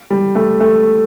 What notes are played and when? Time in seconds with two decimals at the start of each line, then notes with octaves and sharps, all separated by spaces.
0.10 G3
0.35 A3
0.60 A3